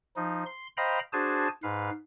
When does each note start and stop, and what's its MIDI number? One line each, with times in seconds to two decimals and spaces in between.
0.16 0.44 53
0.16 0.44 63
0.46 0.67 84
0.77 0.99 72
0.77 0.99 75
0.77 0.99 77
0.77 0.99 79
0.77 0.99 82
0.77 0.99 83
1.13 1.48 62
1.13 1.48 66
1.13 1.48 68
1.13 1.48 72
1.13 1.48 80
1.13 1.48 81
1.63 1.90 44
1.63 1.90 71
1.63 1.90 77